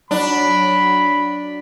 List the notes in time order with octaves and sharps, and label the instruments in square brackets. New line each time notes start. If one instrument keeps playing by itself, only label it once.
[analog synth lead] F#3 [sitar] D4 [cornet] B5